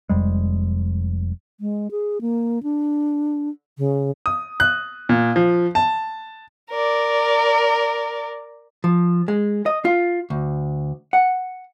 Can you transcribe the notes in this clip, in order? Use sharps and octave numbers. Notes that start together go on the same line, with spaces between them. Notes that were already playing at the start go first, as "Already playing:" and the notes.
F1 F2 G3 G#3
G#3
G#4
A#3
D4
C#3
D#6
F#6
A#2
F3
A5
A#4 D5
F3
G#3
D#5
F4
D2
F#5